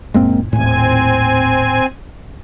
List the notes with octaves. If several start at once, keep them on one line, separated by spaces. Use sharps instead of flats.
F#1 A#2 G#3 A#3 C4
D#1 D#2 A2 C4 G#5